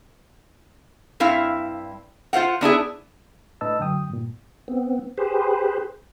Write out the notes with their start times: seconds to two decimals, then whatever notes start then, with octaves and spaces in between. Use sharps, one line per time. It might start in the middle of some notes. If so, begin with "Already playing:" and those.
1.20 G2 C4 E4 F5
2.33 F4 C5 F5 F#5
2.61 B3 D4 E4 G#4
3.61 A2 D4 B4 D#5 A5 E6
3.79 F#2 D3 F#3 G5 D#6
4.10 G2 A#2
4.68 B3 C4
5.18 G4 G#4 B4 C5